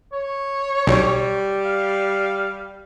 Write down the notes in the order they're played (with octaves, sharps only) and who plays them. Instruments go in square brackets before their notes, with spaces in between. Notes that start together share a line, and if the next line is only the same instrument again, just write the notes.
[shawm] C#5
[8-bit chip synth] B1 [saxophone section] G3
[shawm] F5